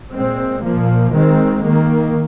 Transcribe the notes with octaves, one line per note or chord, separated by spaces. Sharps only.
A#2 G#3 C4
A#2 F3 A#3
D#3 G#3 C4
D#3 A#3